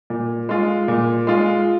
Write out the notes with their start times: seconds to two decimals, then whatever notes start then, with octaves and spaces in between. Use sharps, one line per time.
0.10 A#2
0.49 G#3 F4
0.88 A#2
1.27 G#3 F4